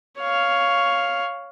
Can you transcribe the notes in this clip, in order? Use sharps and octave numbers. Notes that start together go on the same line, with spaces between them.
C#5 F5